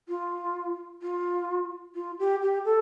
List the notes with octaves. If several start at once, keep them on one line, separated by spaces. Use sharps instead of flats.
F4
F4
F4
G4
G4
A4